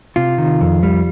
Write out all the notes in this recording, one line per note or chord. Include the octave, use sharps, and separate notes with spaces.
C3 F4
D#3
F2
G3